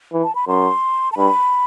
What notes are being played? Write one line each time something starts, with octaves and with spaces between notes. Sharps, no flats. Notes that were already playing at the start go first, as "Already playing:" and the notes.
E3
A5
B5
F#2 C6
A5
G2 B5